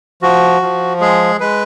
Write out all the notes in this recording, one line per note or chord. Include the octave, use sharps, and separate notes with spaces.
F3 F#4
F3
G#3 G#4
G#3 B4